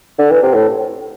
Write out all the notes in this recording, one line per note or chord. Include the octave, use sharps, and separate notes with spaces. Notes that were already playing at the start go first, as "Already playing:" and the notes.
D3
E3
C3
A2